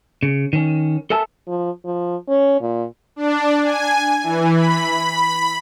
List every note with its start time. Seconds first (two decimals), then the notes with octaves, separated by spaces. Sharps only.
0.23 C#3
0.53 D#3 C#4
1.10 A4 A#4 E5 G#5 A5
1.47 F3
1.84 F3
2.29 C#4
2.61 A#2
3.16 D4
3.63 G#5
4.23 E3
4.55 B5